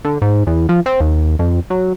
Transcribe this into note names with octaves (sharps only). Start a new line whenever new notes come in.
D3
G#2
E2
F3
C4
D#2
F2
F#3